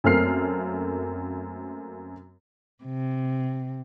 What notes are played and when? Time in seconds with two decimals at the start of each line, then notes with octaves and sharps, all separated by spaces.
0.04 F#2 A3 A#3 C4 F6 C7
2.84 C3